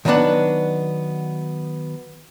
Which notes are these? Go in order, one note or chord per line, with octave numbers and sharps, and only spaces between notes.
D#3 F#3 B3 C4 D4 F#5